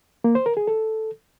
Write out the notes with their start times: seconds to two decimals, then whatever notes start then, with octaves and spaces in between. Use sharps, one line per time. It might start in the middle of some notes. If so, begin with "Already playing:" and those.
0.24 A#3
0.35 C5
0.46 A#4
0.57 G#4
0.67 A4